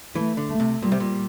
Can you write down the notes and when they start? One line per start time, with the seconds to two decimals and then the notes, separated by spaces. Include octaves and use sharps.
0.15 E3 A3
0.37 D3
0.49 A3
0.60 C3
0.82 A#2 G3
0.92 C3
1.00 A#2